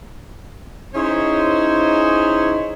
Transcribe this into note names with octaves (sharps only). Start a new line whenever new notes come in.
C#4 D#4 E4 G#4 C5 C#5